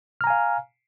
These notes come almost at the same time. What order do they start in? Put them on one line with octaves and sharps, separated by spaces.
F6 A#5 G#5 F5